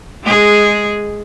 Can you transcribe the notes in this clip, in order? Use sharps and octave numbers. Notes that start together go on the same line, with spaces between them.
G#3 G#4